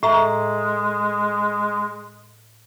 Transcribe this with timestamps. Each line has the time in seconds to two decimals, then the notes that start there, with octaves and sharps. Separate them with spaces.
0.03 A2 G#3 E5 A#5